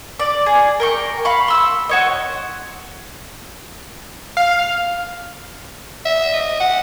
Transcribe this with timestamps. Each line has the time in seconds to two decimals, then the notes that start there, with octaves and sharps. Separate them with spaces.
0.19 D5
0.46 G#4
0.80 A#4 G5 C#6
1.25 F5 B5 C#6
1.48 C6 E6
1.89 F#4 C#5 D#5
4.37 F5
6.05 E5
6.33 D#5
6.60 F#5